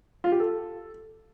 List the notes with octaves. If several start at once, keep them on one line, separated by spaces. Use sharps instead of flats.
F4
G4
A4